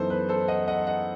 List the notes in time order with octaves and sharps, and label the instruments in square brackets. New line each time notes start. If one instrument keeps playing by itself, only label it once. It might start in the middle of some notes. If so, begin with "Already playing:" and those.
Already playing: [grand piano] F#2 E3 B3 D#4 A4 C5
B4
A4 C5
D#5 F#5
D#5 F#5
D#5 F#5